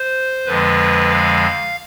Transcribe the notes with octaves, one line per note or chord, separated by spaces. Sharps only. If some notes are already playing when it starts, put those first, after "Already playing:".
Already playing: C5
F2 D3 F3 G#3 B4
F5